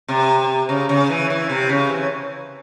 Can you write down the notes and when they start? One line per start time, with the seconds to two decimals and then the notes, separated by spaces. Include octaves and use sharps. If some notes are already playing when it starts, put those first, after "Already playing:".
0.08 C3
0.69 C#3
0.89 C#3
1.10 E3
1.30 E3
1.49 C3
1.69 C#3
1.89 E3